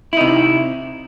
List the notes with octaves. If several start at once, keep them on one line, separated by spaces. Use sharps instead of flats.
C3 D#4 E4